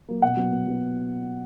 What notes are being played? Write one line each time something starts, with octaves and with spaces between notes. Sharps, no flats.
F#3 A#3
B2 F#5
F#3 B3
B2
F#3 B3